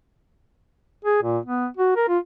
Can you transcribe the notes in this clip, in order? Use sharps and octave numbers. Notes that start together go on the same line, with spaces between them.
G#4
A#2
B3
F#4
A#4
F4